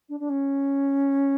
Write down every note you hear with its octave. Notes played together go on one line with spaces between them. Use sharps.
D4
D4
C#4